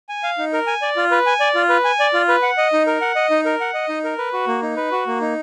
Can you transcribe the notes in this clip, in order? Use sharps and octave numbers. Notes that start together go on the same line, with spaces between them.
G#5
F5
D#4
A#4
G#5
D5
F4
B4
G#5
D5
F4
B4
G#5
D5
F4
B4
F#5
D#5
D#4
A#4
F#5
D#5
D#4
A#4
F#5
D#5
D#4
A#4
B4
F#4
A#3
D#4
B4
F#4
A#3
D#4